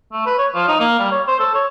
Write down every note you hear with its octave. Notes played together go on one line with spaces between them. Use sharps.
A3
B4
C#5
F3
D#4
A#3
G3
C#5
C5
A4
C#5